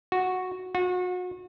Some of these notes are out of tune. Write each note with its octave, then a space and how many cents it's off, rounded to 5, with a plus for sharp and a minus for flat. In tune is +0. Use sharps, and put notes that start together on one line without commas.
F#4 -5
F#4 -35